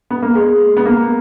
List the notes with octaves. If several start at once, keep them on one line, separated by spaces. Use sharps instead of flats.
B3
A#3
G#3
B3
A#3